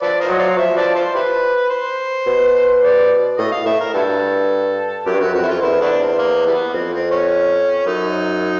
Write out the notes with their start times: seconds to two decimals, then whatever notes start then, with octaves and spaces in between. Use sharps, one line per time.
0.02 F3 A4 B4 D5
0.21 A#4 C5 D#5
0.26 F3
0.30 F#3
0.39 C5 D5 F5
0.58 F3 E5
0.77 A4 B4 D5
0.95 F4 A4 C5
1.15 E4 G4 B4
1.70 C5
2.26 B2
2.82 D5
3.38 A2 D#5
3.52 F5
3.66 A2 E5
3.80 A#4
3.94 G2 E4 F#4 A4
5.06 F#2 G4
5.14 G2
5.20 F#2 F#4
5.34 F2 F#4
5.43 E4
5.48 F4
5.62 E2 E4
5.81 A3 B3 D4
6.00 C4
6.18 A#3
6.47 E3 G3 B3
6.74 F2 C4
6.93 C4
7.11 C#4
7.86 F#2 D#4